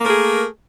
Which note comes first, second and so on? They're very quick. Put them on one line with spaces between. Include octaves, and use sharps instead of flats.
A#3 A3 A#4 G#4